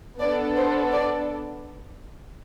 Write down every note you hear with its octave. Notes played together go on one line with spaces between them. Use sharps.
B3 D4 A4 D5
C5
D5